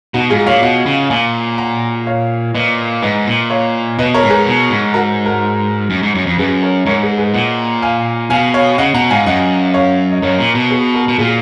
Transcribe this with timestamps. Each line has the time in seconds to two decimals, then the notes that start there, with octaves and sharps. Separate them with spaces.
0.14 B2 D#4 F#4
0.30 G#2 F4 G#4
0.46 A#2 C#5 F5
0.62 B2 D#5 F#5
0.86 C#3
1.10 A#2 F5 G#5
1.58 F#5 A#5
2.07 C#5 F5
2.54 A#2 B4 D#5
3.02 G#2 B4 D#5
3.27 A#2
3.50 C#5 F5
3.99 B2 B4 D#5
4.14 A#4 C#5
4.23 G#2
4.30 G#4 B4
4.47 B2
4.70 G#2
4.94 F#4 A#4
5.26 F#4 A#4
5.90 F#2
6.03 G#2
6.15 F#2
6.26 F2
6.38 F#2 G#4 B4
6.63 A#4 C#5
6.86 G#2 A#4 C#5
7.02 G#4 B4
7.18 G#4 B4
7.34 A#2 D#5 F#5
7.83 F5 G#5
8.30 B2 F5 G#5
8.54 C#5 F5
8.78 C#3 D#5 F#5
8.94 B2 F#5 A#5
9.10 G#2 F5 G#5
9.26 F#2 D#5 F#5
9.74 C#5 F5
10.11 D#5
10.22 F#2 A#4 C#5
10.39 A#2
10.55 B2
10.70 G#4 B4
10.94 F#4 A#4
11.08 B2
11.18 A#2 F4 G#4